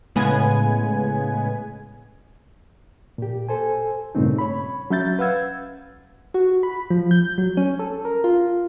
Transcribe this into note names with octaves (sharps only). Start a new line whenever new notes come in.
A2 C#3 G#3 B3 G#5
A#2 G4
A4 C5 G#5
G2 A#2 C#3 A3 C4 D#4
C#5 B5
F#3 C#4 E5 G6 A6
B4 F5 F#5 E6 G#6
F#4
B5
F3
G6
F#3
C#4
A4
A#4
F4